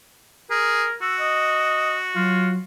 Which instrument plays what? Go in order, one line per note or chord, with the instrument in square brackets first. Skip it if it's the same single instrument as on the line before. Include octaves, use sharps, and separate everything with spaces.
[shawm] G#4 [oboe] A#4
[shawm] F#4 [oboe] E6
[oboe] D#5
[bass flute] F#3 [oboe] F4